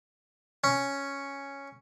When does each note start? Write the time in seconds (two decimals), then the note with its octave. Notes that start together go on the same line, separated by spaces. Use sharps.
0.64 C#4